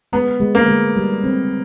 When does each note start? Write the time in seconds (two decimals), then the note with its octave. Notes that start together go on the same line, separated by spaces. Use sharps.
0.13 G#3 B3
0.40 G#3
0.55 A#3
0.68 G#3
0.97 G3
1.24 C4